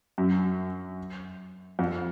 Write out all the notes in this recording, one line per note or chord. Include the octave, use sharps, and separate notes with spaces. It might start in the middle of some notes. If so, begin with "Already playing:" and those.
F#2
F2